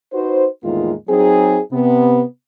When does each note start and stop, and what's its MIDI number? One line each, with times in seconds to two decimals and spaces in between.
0.13 0.46 63
0.13 0.46 66
0.13 0.46 71
0.13 0.46 72
0.63 0.93 40
0.63 0.93 45
0.63 0.93 51
0.63 0.93 56
0.63 0.93 58
0.63 0.93 65
1.09 1.60 54
1.09 1.60 60
1.09 1.60 63
1.09 1.60 68
1.72 2.22 48
1.72 2.22 59